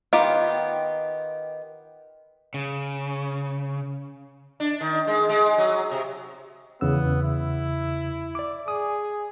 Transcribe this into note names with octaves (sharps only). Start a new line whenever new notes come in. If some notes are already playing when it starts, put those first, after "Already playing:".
D#3 B3 F4 G4
C#3
D4
D#3
G#3
G#3
F#3
C3
E2 C#3 B3 E6
E4
D5 D6
G#4 D#6